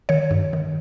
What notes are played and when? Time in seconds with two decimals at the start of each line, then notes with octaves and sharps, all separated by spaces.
0.09 D#3 C#5
0.31 G2
0.53 D#3